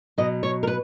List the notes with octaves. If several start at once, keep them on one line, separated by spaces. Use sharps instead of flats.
B2 F#3 D#5
C#5
A#4
B4